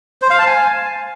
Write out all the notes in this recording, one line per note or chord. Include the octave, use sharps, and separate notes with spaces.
C5
F5
A5
G#5